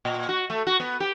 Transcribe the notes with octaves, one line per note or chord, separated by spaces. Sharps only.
A#2
F#4
A3
F#4
B3
G4